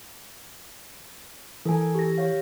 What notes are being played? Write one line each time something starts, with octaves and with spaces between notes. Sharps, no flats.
E3 A4 A#4 G#5
G4 A#6
G4 C#5 F5